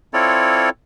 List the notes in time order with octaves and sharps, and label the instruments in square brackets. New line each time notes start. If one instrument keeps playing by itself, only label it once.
[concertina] C4 E4 F4 A4 C#5 D5